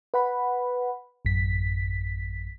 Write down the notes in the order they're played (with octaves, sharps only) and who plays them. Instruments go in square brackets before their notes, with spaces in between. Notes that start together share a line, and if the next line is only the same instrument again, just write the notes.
[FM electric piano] B4 F#5 B5
A1 F#2 B6